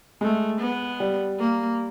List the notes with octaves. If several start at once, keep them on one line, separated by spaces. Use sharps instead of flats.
G#3 A3
B3
G3
A#3